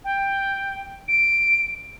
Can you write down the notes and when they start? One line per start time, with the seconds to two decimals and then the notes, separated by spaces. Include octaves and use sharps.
0.05 G5
1.08 D7